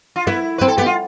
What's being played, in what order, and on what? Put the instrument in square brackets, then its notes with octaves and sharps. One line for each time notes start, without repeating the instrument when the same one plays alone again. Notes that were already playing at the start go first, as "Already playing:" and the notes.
[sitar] F4
[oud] B3 [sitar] E4
[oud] C4 [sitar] B4
[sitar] A4
[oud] B3 [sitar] G4
[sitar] F4